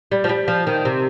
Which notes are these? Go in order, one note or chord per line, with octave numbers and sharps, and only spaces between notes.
G3
F3
G3
F3
D#3
C3